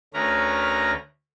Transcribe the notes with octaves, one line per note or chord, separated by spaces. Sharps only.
D2 A3 C#4 A#4 B4 A#5